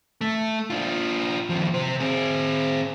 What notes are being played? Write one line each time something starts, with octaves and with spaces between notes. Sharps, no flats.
A3
D4 F4
D#2 F3
C3 C5
C4 G#4